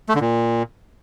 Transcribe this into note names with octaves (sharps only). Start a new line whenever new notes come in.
A3
D3
A#2